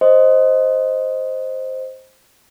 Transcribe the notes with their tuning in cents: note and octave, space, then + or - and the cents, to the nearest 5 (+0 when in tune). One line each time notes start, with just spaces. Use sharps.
C5 +0 D#5 +0